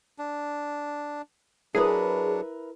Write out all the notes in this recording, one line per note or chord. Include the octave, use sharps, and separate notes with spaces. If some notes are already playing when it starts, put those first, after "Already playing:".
D4
F#3 D4 E4 G#4 A#4 B4